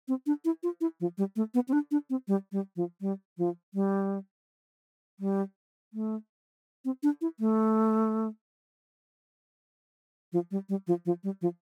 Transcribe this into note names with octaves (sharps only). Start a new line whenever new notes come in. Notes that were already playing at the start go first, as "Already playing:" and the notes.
C4
D4
E4
F4
E4
F3
G3
A3
B3
C4
D4
D4
C4
G3
G3
F3
G3
F3
G3
G3
A3
C4
D4
E4
A3
F3
G3
G3
F3
F3
G3
F3